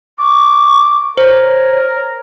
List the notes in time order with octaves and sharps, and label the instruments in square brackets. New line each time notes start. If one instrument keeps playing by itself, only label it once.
[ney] C#6 [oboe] D6
[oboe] A#4 [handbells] C5 [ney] C#5